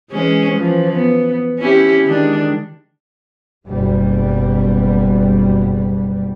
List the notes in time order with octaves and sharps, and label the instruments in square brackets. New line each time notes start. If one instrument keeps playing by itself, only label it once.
[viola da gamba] E3 G#3 C#4
E3 F3
B3
C#4 E4 G4
D#3 G#3 D4
[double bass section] F#1 B2 G3